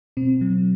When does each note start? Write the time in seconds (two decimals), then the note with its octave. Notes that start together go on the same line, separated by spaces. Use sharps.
0.17 B2 C4
0.41 F#3